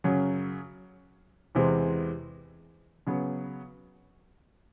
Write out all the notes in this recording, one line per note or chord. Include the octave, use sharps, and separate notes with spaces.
F#2 C#3 F#3
E2 C3 E3 G#3 C4
C#3 F#3 B3